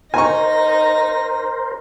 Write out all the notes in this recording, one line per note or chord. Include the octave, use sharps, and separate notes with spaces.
D#4 A#4 C5 G#5 C#6 A#6